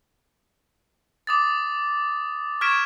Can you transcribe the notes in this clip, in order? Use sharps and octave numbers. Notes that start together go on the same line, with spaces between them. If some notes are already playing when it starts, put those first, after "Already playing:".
D6 D#6 A6
C#6 F6 G#6 B6 D7 E7